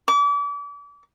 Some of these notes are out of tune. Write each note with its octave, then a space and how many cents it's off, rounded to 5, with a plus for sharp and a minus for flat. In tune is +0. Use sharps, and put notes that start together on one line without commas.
D6 -35